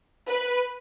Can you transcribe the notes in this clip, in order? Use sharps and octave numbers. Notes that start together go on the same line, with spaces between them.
B4